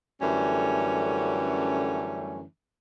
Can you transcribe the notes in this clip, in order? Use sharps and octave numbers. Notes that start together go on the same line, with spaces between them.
F#2 D3 E3 G3 A3 C#4